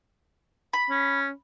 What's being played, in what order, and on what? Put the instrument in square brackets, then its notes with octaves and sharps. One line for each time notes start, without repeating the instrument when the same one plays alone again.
[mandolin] B5
[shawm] C#4